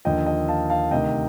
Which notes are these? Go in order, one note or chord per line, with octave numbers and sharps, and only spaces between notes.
D#2 D3 F3 D#5 G5
D#5 G5
F5 A5
F5 A5
D2 C3 D#3 D#5 G5